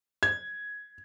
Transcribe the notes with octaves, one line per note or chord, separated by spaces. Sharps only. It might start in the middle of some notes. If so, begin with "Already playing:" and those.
G#6